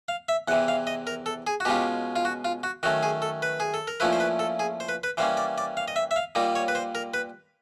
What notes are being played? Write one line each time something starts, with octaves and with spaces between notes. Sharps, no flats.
F5
E5
E2 C3 E3 F#5
F5
D#5
A#4
A4
G#4
F#4
B2 G#3 C#4 F4 G4
F4
F#4
F4
F#4
D#3 F#3 A3 C#4 F#4
G#4
A4
B4
G#4
A4
A#4
A#2 F3 A3 C#4 E4 B4
C5
B4
A4
G#4
C5
B4
B4
E3 G3 A#3 C#4 C5
D5
D5
F5
D#5
E5
E5
F5
A#2 G3 A#3 D#4
C#5
B4
C5
A#4
B4